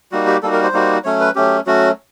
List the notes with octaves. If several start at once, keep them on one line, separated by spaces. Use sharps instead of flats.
G3 A#3 D#4 F#4
G4
G3 A#3 D#4 F#4 A4
A#4
C5
G3 A#3 D#4 F#4
F#3 A3 C#4 C#5
B4
F#3 A3 C#4 G4
F#3 A3 C#4 F#4